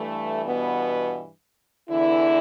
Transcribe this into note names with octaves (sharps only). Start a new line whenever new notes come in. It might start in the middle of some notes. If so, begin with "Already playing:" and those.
Already playing: G2 E3 A3
B2 B3
E2 D3 E3 E4